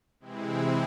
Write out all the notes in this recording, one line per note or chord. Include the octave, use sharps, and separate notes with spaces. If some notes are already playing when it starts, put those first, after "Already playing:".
C3 E3 G#3 C4 E4